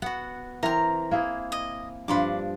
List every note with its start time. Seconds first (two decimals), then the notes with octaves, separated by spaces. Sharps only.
0.02 B3 F#4 F#5
0.63 E3 C4 A#4 A#5
1.11 A#3 E4 G#4
1.52 D#5
2.08 G2 F3 D4 B5 C6 D6